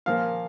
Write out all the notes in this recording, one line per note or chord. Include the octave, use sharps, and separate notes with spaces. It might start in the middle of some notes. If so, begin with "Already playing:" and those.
A#2 F3 A#3 F5